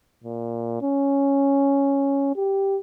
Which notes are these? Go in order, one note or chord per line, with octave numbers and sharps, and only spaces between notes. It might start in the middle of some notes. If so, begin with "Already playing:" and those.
A#2
C#4
G4